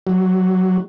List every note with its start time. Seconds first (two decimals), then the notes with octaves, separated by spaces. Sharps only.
0.07 F#3